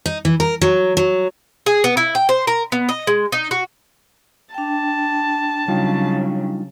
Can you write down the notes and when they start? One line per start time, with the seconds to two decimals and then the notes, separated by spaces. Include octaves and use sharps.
0.06 D#4
0.25 E3
0.40 A#4
0.61 F#3
0.97 F#3
1.66 G#4
1.84 B3
1.97 E4
2.15 G5
2.29 C5
2.47 A#4
2.72 B3
2.89 D#5
3.07 G#3
3.32 D#4
3.51 F#4
4.54 D4 G5 A5
5.68 C#3 F#3 G3 D#4 F4